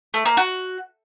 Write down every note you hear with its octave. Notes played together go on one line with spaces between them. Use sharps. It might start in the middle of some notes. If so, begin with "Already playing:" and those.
A3
A#3
F#4